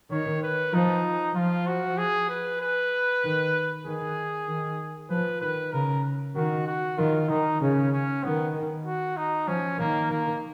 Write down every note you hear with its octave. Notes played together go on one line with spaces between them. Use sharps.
D#3 C#5
B4
F3 D#4
F3 F4
F#4
G#4
B4
B4
D#3
D#3 G#4
D#3
F3 B4
D#3 B4
C#3 A#4
D#3 F#4
F#4
D#3 F4
D#3 D#4
C#3 C#4
C#4
D#3 B3
F#4
D#4
F3 C#4
D#3 A#3
D#3 A#3